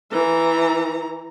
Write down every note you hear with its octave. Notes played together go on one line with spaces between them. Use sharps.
E3 A#5